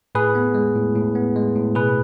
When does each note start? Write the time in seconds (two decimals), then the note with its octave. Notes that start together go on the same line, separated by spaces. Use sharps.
0.15 A2 G#4 B4
0.35 B3
0.55 G#3
0.75 A2
0.95 A2
1.15 B3
1.36 G#3
1.56 A2
1.75 B2 G#4 B4